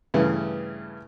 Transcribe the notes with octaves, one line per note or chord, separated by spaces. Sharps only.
G2 C#3 E3 A3